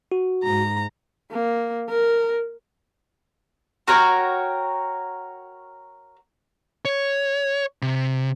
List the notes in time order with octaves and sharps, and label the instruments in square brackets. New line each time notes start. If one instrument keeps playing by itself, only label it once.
[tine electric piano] F#4
[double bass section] G#2 [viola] A#5
[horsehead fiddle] A#3
A#4
[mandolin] F#4 A#4 C#5 G5
[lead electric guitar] C#5
C3